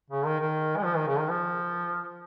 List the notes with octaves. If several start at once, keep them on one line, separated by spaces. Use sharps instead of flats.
C#3
D#3
D#3
G#3
F3
D#3
C#3
D#3
F3